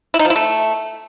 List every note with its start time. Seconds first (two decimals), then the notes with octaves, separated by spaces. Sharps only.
0.14 E4
0.19 D#4
0.25 F3
0.30 E4
0.36 A3